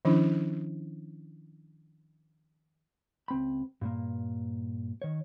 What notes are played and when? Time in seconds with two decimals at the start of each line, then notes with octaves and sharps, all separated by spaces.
0.05 D#3 F3 C#4 D4 E4
3.28 C#2 C4 B5
3.81 G2 A#2 A#3
5.02 D#3 C#5